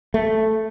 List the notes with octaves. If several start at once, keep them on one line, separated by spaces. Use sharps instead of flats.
A3